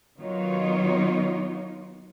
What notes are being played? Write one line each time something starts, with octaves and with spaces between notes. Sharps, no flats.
D#3 F#3 B3 D#4 F4 C#5